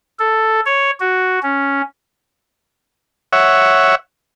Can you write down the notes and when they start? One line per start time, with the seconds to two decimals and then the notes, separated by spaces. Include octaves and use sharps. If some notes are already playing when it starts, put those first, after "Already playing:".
0.19 A4
0.65 C#5
1.00 F#4
1.43 C#4
3.33 C#5 E5 F#5